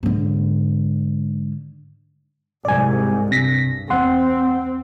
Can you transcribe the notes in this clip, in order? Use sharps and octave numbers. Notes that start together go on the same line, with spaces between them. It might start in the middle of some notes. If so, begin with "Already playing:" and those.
G#2 D3
C2 G#2 C3 D5 G#5
G2 C3 A#6 B6
E2 C4 F#5 C6